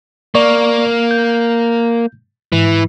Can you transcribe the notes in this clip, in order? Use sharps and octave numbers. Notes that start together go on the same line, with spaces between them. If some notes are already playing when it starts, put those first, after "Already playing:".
A#3 D5 C#6
G6
G#2 E3